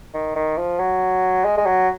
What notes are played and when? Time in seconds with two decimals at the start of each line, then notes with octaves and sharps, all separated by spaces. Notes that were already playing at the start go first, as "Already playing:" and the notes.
0.14 D#3
0.36 D#3
0.57 F3
0.79 F#3
1.45 G#3
1.58 G#3
1.66 F#3